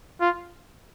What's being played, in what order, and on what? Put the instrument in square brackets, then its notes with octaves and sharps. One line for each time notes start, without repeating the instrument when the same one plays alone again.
[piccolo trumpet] F4